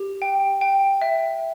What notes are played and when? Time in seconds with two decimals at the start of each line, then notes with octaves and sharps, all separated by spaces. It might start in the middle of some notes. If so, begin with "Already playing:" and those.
Already playing: G4
0.22 G5
0.61 G5
1.02 E5